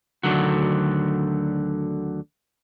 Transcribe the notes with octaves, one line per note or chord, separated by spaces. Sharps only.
D2 D3 D#3 F#3 F#4